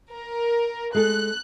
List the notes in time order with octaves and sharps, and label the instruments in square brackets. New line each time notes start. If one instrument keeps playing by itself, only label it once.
[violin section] A#4
[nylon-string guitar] G#3 A4 [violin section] F#6